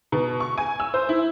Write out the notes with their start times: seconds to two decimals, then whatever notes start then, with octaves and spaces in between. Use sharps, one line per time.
0.12 B2
0.40 C#6
0.58 G#5
0.80 E6
0.94 C5
1.09 E4